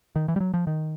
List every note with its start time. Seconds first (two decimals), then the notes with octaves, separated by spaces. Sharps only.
0.16 D#3
0.28 E3
0.36 G3
0.40 F#3
0.54 F3
0.67 D#3